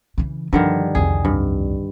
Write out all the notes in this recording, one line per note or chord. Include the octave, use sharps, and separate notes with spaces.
C#3 E3
G2 D3 D#3 F3
C2 F2 G#4
G2